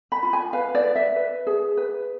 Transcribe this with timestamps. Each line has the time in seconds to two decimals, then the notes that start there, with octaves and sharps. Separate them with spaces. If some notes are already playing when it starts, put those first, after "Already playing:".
0.12 B5
0.23 F4
0.33 G#5
0.53 B4 F5
0.75 D5
0.84 B4
0.95 E5
1.16 B4
1.47 G#4
1.77 B4